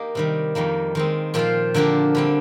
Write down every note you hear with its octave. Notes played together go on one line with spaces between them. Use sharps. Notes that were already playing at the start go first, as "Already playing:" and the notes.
Already playing: A#3 D#4 G4 A#4
C3 D#3 G3
F2 D#3 G3 A#3
D#3 G#3 C4
A#2 F3 C4 F4 C5
D3 F3 A#3 D4 G4
D3 G3 C4